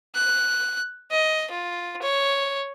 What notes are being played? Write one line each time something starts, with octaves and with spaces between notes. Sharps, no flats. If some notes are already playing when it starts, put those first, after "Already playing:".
F#6
D#5
F4
C#5